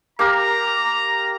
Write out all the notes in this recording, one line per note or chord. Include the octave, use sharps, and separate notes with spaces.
A#3 G4 A#4 A#5